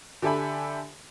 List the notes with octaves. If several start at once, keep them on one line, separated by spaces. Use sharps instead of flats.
D3 G4 A4 E5 G#5 B5